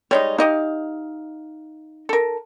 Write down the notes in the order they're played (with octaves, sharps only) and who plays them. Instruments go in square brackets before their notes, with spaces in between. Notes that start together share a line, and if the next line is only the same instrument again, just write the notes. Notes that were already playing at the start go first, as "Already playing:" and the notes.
[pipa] G3 G#3 D#4 [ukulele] C#5
[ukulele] D#4 [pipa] G4 D#5 F5
[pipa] A4 A#4